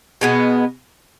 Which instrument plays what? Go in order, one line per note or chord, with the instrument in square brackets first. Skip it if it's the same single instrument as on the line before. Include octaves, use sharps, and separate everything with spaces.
[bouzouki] B2 G#3 B3